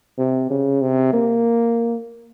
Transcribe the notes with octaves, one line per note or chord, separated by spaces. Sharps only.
C3
C#3
C3
A#3